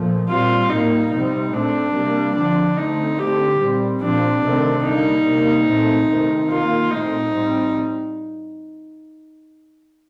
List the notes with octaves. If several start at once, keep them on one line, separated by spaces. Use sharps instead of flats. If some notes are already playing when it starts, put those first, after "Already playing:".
Already playing: A#2 F3 A3
A#2 G3 C4 F4
A2 G3 A#3 D#4
C3 G3 C4 D#4
A#2 A3 C4 D4
C3 G3 A#3
D3 F3 C4 D4
D3 A3 C4 D#4
D3 A3 C4 G4
A#2 G3 C4
A#2 F3 C4 D4
C3 D#3 A3 C4
D3 G3 A#3 D#4
C3 G3 A#3
A#2 A3 C4
C3 D#3 A3 C4
D#3 A#3 F4
A#2 A3 C4 D#4
A2 G3 C4